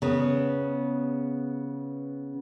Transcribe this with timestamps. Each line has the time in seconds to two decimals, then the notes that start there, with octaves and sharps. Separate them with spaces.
0.02 C#3 B3